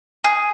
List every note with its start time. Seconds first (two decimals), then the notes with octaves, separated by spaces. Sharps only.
0.24 G#4